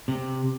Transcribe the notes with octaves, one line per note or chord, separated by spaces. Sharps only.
C3